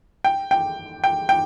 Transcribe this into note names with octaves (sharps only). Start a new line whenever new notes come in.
G5
G5
G5
G5